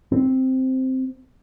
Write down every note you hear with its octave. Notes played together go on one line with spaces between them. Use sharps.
C4